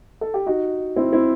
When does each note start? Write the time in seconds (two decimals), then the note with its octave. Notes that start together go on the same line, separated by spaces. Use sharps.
0.21 A4
0.34 G4
0.46 D#4 F#4
0.96 C4 E4
1.13 C4 E4